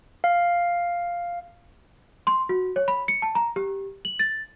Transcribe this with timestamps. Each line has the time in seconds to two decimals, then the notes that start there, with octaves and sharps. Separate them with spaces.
0.24 F5
2.27 C6
2.49 F#4
2.76 C#5
2.88 B5
3.08 C#7
3.22 A5
3.35 A#5
3.56 G4
4.05 F#7
4.19 A6